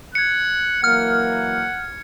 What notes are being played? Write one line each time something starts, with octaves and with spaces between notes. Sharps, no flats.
F#6 G#6 C#7
E3 F#3 A#3 F#5 F6